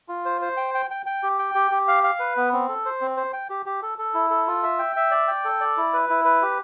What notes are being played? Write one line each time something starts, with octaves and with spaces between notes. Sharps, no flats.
F4
C5
C5
G5
G5
G5
G5
G4
G5
G4
G4
F5
F5
B4
B3
C4
A4
C5
C4
C5
G5
G4
G4
A4
A4
E4
A4
F4
E5
G5
E5
D5
G5
A4
D5
E4
B4
E4
B4
G4